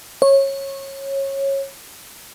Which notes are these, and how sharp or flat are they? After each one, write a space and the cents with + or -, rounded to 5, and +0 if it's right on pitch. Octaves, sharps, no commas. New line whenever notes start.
C#5 -20